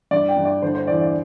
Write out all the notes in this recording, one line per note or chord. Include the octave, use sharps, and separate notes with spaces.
G2 D5
G5
G2
D5
D3 C5
C5
E2 D5
D5